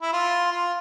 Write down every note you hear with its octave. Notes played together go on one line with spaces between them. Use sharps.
E4
F4
F4